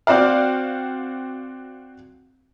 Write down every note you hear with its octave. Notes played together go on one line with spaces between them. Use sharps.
C4 F#4 D5 F5